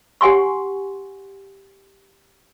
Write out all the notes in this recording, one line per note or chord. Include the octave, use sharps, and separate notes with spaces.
G4 F#5 G#5 C6 C#6